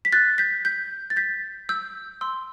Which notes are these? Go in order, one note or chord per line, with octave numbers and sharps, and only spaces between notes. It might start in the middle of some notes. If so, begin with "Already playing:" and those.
B6
F#6 A6
G6 B6
G6 B6
A6
G6 B6
E6 G6
C6 E6